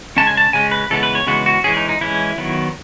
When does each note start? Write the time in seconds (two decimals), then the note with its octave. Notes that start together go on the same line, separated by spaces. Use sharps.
0.17 C#3 G#3 C#4 A5
0.27 G#5
0.37 A5
0.53 C#3 G#3 C#4 G#5
0.71 B4
0.90 C#3 E3 G#3 B3 A4
1.03 B4
1.15 C#5
1.27 C#3 E3 G#3 B3 F#4
1.46 F#4
1.64 E3 G#3 C#4 G#4
1.77 D#4
1.89 D#4
2.01 E3 G#3 C#4 E4
2.38 D#3 F#3 B3